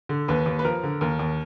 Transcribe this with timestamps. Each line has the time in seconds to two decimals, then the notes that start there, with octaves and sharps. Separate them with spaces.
0.09 D3
0.28 D#2 B4
0.46 D#2
0.59 B4
0.65 F3 A#4
0.83 D3
1.01 D#2 A#4
1.19 D#2